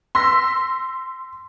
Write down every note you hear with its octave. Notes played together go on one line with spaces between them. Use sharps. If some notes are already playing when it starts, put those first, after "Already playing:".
C6 E6 A#6 B6